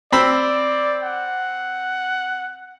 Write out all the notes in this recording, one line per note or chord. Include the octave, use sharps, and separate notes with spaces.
C4 D5 B5 E6
F#5